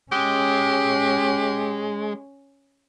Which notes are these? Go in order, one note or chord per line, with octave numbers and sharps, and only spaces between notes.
G#3 C#4 G4